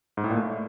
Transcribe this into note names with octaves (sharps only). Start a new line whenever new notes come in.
G#2
A2
A#2
A3